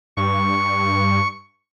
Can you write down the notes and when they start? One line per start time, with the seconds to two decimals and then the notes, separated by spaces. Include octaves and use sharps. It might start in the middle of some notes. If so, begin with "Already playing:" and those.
0.17 G2 C#6